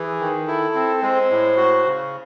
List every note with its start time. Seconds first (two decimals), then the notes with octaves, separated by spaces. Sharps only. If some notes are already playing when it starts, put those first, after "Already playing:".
Already playing: E3 G#4
0.20 D#3
0.48 E4 A4
0.75 C4
1.02 G#3 C5
1.31 A2
1.57 F#4
1.85 C#3